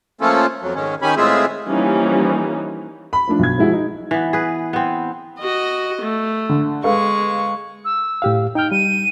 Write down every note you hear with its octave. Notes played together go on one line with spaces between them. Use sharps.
F3 A3 A#3 C#4 F4 A4
F2 F#3
G#2 D#3 C#4
D#3 C#4 G4 G#5 B5
A2 G#3 C4 F4 G#4 E5
E3 F3 G3 A#3 C#4 D#4
B5
F3 A3 D4
B1 G#6
F3 G#3 E4 F#4
D#4
E3 B3
G#4 B4
B3 C4
F#4 D#5
A3
D3
G#3 A4 B4 F5 C#6
E6
A2 G4 F5
D#4 G5 F6
G3 D#7